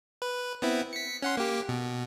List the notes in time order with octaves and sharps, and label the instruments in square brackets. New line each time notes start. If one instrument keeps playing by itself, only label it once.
[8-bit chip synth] B4
B3 C4 E4
B6 C#7
C#4 F#5 C6
A#3 G4
B2